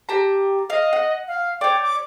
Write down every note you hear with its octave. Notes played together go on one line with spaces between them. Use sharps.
G4 A5 A#5
D#5 F5
F#5
F5
C#5 D5 G5
D6